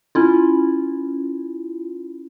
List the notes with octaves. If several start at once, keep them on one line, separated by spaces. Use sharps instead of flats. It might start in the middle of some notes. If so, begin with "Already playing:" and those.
C#4 E4 F4